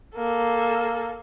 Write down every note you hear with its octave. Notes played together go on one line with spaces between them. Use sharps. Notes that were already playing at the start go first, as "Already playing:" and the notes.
A#3 A4